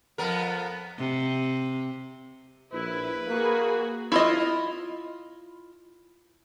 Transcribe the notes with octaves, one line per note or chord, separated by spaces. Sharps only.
F2 B3 A#4
C3
A#1 E4 B4
A#3 F#4 G#4
E4 F4 D#5